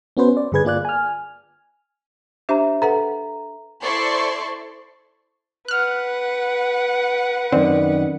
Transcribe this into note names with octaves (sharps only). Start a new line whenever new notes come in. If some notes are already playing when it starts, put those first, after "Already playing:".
B3 C#4 F#4 B4 C5
D5
G2 D3 G#4 B4 G#6
A#3 F4 D5 F#6
G#5 F6
D4 G4 C5 E5 A#5
A4 B4 F#5 A#5
E4 A4 C5 D5 C6 C#6
B4 F#5 F6 F#6
F#2 D#3 C4 D5